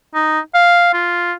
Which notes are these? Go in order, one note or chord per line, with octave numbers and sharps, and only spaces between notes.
D#4
F5
F4